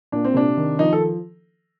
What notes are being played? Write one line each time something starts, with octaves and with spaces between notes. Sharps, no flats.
A#2 D4
C4
C3 D4
D#3
F3 D#4
A4